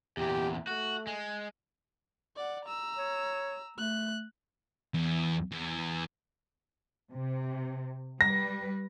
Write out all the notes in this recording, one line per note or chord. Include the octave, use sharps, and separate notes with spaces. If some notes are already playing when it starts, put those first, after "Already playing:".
E2 A#2 G4
A3 F#4
G#3
D5 F#5
A#5 E6
C#5
A3 F#6
E2
E2
C3
G3 B4 A#6